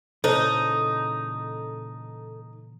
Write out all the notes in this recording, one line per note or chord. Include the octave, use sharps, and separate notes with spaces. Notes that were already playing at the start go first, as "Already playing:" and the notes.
A#2 C#3 E3 D#4 A4 C5